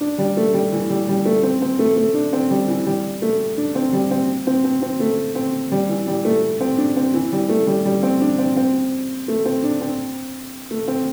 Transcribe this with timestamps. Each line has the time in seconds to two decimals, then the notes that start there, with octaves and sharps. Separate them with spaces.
0.01 D4
0.18 G3
0.37 A3
0.54 G3
0.72 E3
0.90 G3
1.09 G3
1.25 A3
1.43 C4
1.62 C4
1.79 A3
1.97 A3
2.14 D4
2.33 C4
2.51 G3
2.68 E3
2.86 G3
3.22 A3
3.58 D4
3.75 C4
3.93 G3
4.11 C4
4.47 C4
4.64 C4
4.82 C4
5.00 A3
5.35 C4
5.72 G3
5.89 E3
6.07 G3
6.25 A3
6.61 C4
6.78 D4
6.96 C4
7.14 E3
7.32 G3
7.49 A3
7.67 G3
7.85 G3
8.03 C4
8.21 D4
8.38 C4
8.57 C4
9.28 A3
9.45 C4
9.64 D4
9.81 C4
10.71 A3
10.88 C4